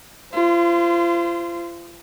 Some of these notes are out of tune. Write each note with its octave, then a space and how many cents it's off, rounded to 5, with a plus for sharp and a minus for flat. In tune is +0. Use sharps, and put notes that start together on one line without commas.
F4 -35 C5 -15